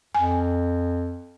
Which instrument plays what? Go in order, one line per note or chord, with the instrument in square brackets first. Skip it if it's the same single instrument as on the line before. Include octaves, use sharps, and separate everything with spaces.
[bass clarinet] F2 [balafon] G#5